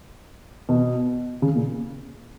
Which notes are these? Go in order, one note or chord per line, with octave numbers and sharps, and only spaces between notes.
B2
C#3
A#2